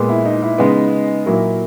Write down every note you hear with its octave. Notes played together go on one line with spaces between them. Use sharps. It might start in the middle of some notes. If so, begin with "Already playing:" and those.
Already playing: A#2 G#3 B3
E4
D#4
E4
C#3 G#3 B3 D#4
A#2 F#3 A#3 E4